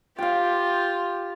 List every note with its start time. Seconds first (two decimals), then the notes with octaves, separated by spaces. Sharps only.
0.18 F4 G4 F5 G5